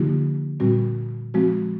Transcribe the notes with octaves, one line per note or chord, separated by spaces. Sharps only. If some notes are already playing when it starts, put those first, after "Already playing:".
Already playing: D3 F3 A#3 D#4 F4 G4
A#2 G3 C4 F#4
F3 G#3 C4 F#4